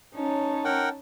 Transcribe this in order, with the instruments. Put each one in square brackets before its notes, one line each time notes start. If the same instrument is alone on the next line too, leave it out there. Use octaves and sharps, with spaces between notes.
[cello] C#4 C#5 [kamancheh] D#4 A5
[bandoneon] A#4 F#5 G5